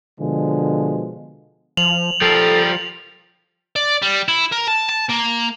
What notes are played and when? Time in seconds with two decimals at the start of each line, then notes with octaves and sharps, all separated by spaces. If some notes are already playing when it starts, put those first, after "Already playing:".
0.19 B2 D3 F3 G#3
1.77 F3 F7 F#7
2.22 F3 G3 A4 A#4
3.76 D5
4.02 G3
4.28 E4
4.52 A#4
4.67 A5
4.89 A5
5.10 A#3